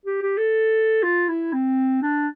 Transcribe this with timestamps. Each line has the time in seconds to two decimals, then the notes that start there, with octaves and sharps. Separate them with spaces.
0.06 G4
0.22 G4
0.38 A4
1.03 F4
1.28 E4
1.53 C4
2.02 D4